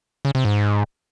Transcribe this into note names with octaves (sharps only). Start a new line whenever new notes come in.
C#3
C3
G#2